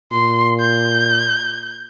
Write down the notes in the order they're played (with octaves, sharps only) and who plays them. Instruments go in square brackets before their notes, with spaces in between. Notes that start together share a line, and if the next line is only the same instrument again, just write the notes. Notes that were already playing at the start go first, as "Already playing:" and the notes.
[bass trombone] A#2 [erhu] C6
[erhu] G6